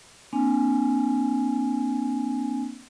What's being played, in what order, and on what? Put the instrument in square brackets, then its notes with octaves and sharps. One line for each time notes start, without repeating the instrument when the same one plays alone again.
[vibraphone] A#3 C4 D4 G#5